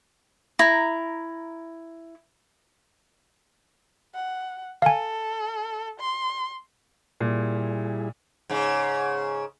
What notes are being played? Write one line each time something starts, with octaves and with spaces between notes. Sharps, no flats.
E4 A#5
F#5
A4 F5 G#5
C6
A#2 G3 E4 G#4
G#2 C#3